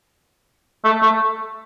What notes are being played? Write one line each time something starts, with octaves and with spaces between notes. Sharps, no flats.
A3
A3